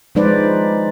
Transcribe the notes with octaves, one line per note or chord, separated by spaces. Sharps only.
F3 G#3 D#4 B4 C5 D5